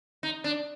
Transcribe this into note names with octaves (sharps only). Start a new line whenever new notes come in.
D#4
D4